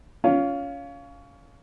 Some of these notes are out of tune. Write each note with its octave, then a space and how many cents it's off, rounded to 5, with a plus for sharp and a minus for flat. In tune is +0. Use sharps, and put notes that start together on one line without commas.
C#4 +25 F4 +0